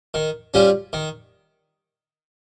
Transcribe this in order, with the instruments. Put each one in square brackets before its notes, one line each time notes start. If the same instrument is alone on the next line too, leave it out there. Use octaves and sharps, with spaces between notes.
[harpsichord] D#3
G3 C#4 F4
D#3